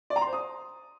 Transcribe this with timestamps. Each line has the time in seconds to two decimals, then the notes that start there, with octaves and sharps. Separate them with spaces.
0.10 D5
0.16 A#5
0.22 C6
0.27 C5
0.33 D#6